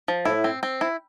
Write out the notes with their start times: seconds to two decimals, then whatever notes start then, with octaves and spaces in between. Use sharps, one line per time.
0.08 F3
0.25 A2 E4
0.44 C4
0.63 C4
0.81 E4